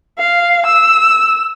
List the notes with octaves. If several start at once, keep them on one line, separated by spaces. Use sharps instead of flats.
F5
E6